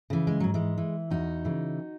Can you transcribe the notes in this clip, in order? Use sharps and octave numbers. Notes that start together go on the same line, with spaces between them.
C#3 E3
G#3
G#2 F#3
E3 G#3
E3
E2 D#4 F#4
C#3 E3